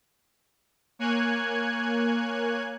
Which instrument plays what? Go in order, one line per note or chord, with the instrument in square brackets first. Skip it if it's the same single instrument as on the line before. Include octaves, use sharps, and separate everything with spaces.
[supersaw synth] A#3 C#5 G#5 F#6 G#6